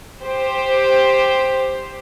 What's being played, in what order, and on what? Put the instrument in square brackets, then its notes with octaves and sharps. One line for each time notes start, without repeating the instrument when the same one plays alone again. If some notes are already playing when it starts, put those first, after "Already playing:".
[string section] G4 C5